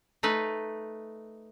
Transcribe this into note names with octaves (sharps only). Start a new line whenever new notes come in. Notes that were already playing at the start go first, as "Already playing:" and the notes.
A3 D#4 B4